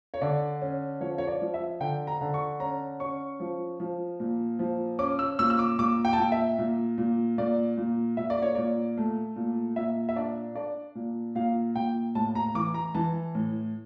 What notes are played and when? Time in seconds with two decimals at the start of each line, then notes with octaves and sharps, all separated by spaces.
0.14 C#5
0.21 D3 D5
0.62 C#4
1.01 F3 C#5
1.18 C#5
1.27 D5
1.41 F3
1.54 E5
1.80 D3 G5
2.07 A#5
2.21 D3
2.34 C#6
2.60 C#4 A#5
3.00 C#4 C#6
3.40 F3
3.80 F3
4.20 A#2
4.59 F3
4.99 C#4 D6
5.19 E6
5.39 A#2 E6
5.50 E6
5.59 D6
5.79 A#2 D6
6.05 G5
6.13 A5
6.18 A#2 G5
6.32 E5
6.58 A#2
6.98 A#2
7.38 A#2 D5
7.78 A#2
8.17 A#2 E5
8.30 D5
8.42 C#5
8.55 A#2 D5
8.97 A3
9.36 A#2
9.76 A#2 E5
10.09 E5
10.16 D4 D5
10.55 D4 D5
10.95 A#2
11.35 A#2 F5
11.75 A#2 G5
12.15 A2 A5
12.35 A#5
12.55 E3 D6
12.74 A#5
12.95 E3 A5
13.35 A2